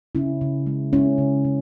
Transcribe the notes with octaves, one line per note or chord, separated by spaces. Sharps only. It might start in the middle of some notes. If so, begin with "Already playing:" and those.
C#3 C#4 E4
C#3
G#3
G#3 C#4 E4
C#3
C#3